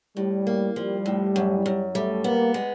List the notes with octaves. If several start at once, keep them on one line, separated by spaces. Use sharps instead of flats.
A2 G3
A#3
F3 G3
A2
F#2
F#2
G3 A3
A#3 B3
G#3